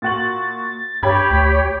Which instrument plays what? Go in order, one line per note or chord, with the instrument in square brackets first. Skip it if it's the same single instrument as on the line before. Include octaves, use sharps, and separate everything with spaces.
[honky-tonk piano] A#2 F#4 F#7 [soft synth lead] A6
[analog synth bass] G2 [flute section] G4 C#5 [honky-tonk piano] G5 B5 G#6
[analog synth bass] D2 [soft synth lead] B6